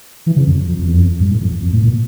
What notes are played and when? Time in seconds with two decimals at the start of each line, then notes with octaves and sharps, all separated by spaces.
0.26 E3
0.36 C#3
0.48 F2
0.58 F2
0.68 F2
0.79 F2
0.86 E2
0.93 F2
1.20 G2
1.31 A2
1.41 F2
1.52 E2
1.62 F2
1.73 A2
1.83 A#2